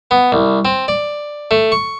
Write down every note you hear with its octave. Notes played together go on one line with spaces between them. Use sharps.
B3
C2
C4
D5
A3
C#6